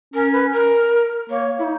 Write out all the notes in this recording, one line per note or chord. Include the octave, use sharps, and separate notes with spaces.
C#4 A#4
B4
A#4
A#3 C#5
E4
D#4